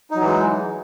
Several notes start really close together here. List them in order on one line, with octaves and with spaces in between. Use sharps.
D#4 F#3 E3 G#3